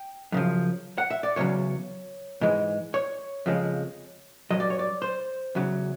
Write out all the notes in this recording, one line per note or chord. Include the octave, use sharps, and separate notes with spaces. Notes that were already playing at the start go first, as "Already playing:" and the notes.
Already playing: G5
F#2 C#3 F3
F#5
E5
D5
E2 C#3 F#3 C#5
G#2 E3 G#3
C#5
F2 C#3 F3 G#3
G2 D#3 F#3 D#5
D5
C#5
D5
C5
E2 C#3 F#3